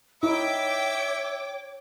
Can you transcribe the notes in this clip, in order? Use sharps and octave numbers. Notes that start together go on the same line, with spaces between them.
D#4 E4 C#5 E5 G5 D6